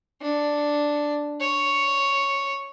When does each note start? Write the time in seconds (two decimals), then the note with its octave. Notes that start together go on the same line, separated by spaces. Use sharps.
0.21 D4
1.41 C#5